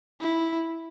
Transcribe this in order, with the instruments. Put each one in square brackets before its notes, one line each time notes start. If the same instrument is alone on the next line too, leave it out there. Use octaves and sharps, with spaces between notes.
[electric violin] E4